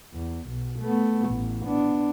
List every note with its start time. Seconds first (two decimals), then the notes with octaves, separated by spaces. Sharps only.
0.14 E2
0.48 B1
0.81 A3 B3
1.30 A1
1.63 B3 D4